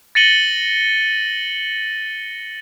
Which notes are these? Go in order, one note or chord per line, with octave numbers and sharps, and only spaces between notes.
A6 A#6 C#7 D#7 F#7 G7